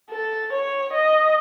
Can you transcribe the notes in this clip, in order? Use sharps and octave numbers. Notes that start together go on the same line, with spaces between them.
A4
C#5
D#5